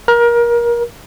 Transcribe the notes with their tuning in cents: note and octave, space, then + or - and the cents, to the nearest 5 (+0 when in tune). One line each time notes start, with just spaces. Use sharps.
A#4 +25